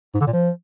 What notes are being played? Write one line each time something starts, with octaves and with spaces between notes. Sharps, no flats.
G#2
D3
A#2
F3